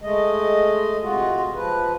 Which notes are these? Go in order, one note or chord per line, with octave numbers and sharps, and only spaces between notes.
G#3 A3 D#5
C3 G#3 F4 F#4
F3 B4